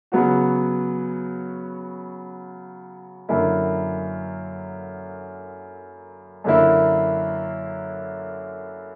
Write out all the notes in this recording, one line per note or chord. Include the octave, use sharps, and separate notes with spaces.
C#3 F#3 B3 F#4
F#2 D3 A#3 E4
F#2 D3 A#3 E4